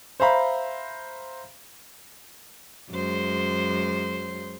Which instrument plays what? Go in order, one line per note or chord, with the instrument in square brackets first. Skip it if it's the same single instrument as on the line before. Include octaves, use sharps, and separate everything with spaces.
[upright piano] C5 E5 F5 A#5 B5
[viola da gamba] F#2 G#3 C5